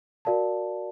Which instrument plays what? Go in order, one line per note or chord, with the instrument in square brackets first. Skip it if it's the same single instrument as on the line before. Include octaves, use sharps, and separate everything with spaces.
[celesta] F#4 A#4 D5 F5 A5